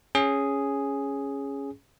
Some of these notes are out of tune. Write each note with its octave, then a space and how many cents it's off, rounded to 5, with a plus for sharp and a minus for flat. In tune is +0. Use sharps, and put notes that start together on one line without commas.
C#4 +0 G#4 +0